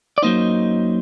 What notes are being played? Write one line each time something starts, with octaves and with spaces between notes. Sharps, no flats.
D5
F#2 F#3 A#3 D#4 C5 D#5